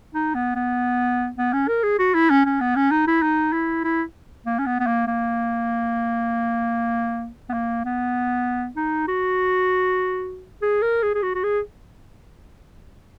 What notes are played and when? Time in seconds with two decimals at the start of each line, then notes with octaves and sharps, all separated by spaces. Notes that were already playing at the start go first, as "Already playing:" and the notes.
0.14 D#4
0.34 B3
0.55 B3
1.38 B3
1.53 C#4
1.68 A#4
1.83 G#4
1.99 F#4
2.14 E4
2.30 C#4
2.45 C#4
2.61 B3
2.76 C#4
2.91 D#4
3.07 E4
3.22 D#4
3.53 E4
3.84 E4
4.46 A#3
4.58 C#4
4.66 B3
4.80 B3
4.86 A#3
5.07 A#3
7.49 B3
7.53 A#3
7.85 B3
8.76 D#4
9.08 F#4
10.62 G#4
10.82 A#4
11.03 G#4
11.15 G#4
11.23 F#4
11.35 F#4
11.44 G#4